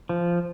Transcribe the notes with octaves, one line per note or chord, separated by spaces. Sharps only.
F3